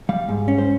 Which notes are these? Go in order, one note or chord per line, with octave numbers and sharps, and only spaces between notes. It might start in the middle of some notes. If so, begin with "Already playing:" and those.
G3 F5
G#2
C#4
C5